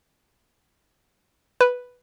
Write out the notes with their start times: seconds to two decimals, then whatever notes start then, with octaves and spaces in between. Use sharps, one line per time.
1.61 B4